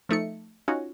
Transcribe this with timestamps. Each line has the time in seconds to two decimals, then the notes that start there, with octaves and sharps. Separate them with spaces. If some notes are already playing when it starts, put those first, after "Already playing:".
0.09 F3 A3 D#4 C#7
0.68 C#4 D#4 F4 F#4